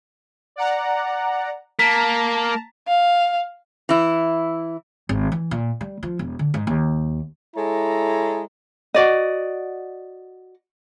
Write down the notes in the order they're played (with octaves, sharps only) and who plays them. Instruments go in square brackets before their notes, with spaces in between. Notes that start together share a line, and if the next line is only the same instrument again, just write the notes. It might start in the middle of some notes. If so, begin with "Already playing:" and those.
[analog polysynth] D5 F#5 A#5
[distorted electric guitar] A#3 [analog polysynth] A5 A#5 [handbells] B6
[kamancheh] F5
[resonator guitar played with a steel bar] E3 E4
[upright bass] G#1
E3
A#2
G3
F3
E1
D3
G#2
D#2
[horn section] G#3 E4 A4 C#5 A#5
[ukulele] F#4 D5 D#5